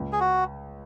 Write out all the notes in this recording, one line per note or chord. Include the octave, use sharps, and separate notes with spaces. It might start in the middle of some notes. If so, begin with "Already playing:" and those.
Already playing: C#2
G#4
F#4